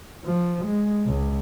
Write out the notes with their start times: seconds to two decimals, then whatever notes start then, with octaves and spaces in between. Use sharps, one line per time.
0.24 F3
0.65 G#3
1.06 C#2